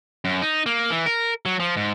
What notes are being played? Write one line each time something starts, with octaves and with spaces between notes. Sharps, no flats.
F#2
D#4
A#3
E3
A#4
F#3
F3
G#2